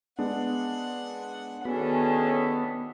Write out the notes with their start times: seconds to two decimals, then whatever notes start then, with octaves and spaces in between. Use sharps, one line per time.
0.19 G#3 B3 D4 F#5
1.65 D#3 B3 C#4 D4 F#4 G#4 A4